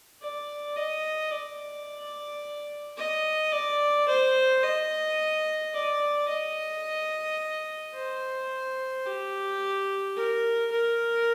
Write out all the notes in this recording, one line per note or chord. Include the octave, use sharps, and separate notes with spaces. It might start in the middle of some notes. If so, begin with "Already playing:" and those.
D5
D#5
D5
D#5
D5
C5
D#5
D5
D#5
C5
G4
A#4
A#4